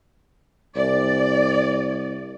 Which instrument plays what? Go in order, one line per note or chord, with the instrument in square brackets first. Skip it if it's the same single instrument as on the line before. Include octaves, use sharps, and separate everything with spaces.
[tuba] C2 [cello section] D5